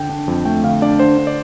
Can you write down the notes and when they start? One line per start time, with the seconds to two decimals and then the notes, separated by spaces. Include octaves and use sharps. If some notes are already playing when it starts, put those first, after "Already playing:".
Already playing: D3 G5
0.09 D4
0.28 F2
0.45 A3 G5
0.64 D3 F5
0.82 D4 D5
0.99 D3 C5
1.18 D4
1.27 D5